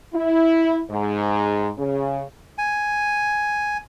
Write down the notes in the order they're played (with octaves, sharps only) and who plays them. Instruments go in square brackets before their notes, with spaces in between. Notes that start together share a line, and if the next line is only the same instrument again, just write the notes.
[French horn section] E4
G#2
C#3
[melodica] G#5